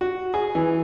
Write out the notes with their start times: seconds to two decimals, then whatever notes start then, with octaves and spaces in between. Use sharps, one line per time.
0.01 F#4
0.34 G#4
0.55 E3